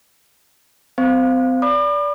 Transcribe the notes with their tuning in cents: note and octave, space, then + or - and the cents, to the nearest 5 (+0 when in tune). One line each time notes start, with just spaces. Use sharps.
C4 -35 C5 -5 F5 +0
D5 -20 B5 -10 D6 +45